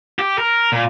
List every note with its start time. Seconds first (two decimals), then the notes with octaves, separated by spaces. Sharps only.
0.19 G4
0.38 A#4
0.72 A#2